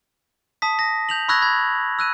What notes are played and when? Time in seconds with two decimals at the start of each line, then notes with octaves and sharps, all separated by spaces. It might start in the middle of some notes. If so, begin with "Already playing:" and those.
0.62 A5 D#6 B6
0.79 A#6
1.09 G6 F7 F#7
1.29 B5 C#6 E6 F#6 G#6 A#6
1.42 B5 G#6
1.99 E6 F#6 D#7